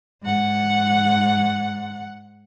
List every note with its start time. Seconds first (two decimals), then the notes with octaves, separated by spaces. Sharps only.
0.22 G#2 F#5